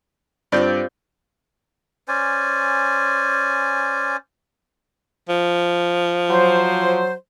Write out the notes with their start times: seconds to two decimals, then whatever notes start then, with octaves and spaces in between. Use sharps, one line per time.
0.52 G2 C4 F4 G4 D5 G6
2.08 C#4 C5 D5 G#5
5.29 F3
6.30 F#3 C5